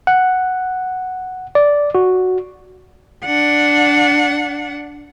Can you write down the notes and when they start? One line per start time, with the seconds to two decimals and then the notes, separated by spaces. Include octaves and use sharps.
0.07 F#5
1.55 D5
1.95 F#4
3.25 D4 F#5